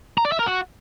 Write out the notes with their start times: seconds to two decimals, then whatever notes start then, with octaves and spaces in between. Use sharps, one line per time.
0.18 A#5
0.25 D5
0.32 E5
0.39 A#4
0.46 F#4